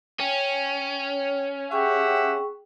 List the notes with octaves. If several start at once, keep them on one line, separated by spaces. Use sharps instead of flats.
C#4 G5
G4 G#4 E5 F#5 G5 C#6